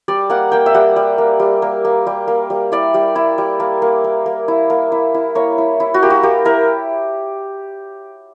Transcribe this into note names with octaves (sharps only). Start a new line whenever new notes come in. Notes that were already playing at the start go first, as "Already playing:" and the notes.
G3 D5
A#3 F#5
A#3 G5
E5
G3 F#5
G3
A#3
G3
A#3
A#3
G3
A#3
G3
E4 D5
G3
E4
G3
A#3
A#3
A#3
A#3
E4
A#3
E4
E4
A#3 C#5
E4
E4
F#4
A#3 G4
F#4
A#3 G4
E4 A#4